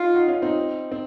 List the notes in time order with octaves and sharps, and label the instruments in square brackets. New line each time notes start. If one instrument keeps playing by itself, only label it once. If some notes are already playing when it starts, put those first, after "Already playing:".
Already playing: [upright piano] D#4 [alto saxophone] F4
[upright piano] D#4 F#4
C#4 F4
C4 D#4
C4